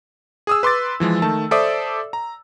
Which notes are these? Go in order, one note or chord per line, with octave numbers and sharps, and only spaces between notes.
G#4 D#6 E6
B4 C6 D6 A6
E3 F3 G#3
D#3 A3 A5
A4 C5 D5 E5 D6 D#6
A#5